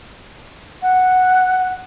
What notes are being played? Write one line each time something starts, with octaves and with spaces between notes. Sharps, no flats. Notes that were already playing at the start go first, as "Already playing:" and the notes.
F#5